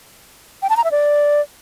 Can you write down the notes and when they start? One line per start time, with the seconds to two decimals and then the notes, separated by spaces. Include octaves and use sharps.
0.62 G5
0.70 A5
0.77 A#5
0.84 E5
0.91 D5